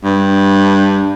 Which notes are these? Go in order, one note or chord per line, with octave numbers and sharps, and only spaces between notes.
G2